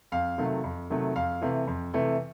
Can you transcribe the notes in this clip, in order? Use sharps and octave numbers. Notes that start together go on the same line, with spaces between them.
F2 F5
C3 D#3 F#3 A3
F2
C3 D#3 F#3 A3
F2 F5
C3 E3 A3
F2
C3 E3 A3